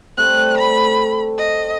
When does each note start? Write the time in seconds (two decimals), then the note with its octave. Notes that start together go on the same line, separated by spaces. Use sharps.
0.17 G3 A3 C4 F#6
0.58 A3 B5
1.38 D#5